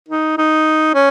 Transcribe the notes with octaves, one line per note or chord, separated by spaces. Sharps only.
D#4
D#4
C#4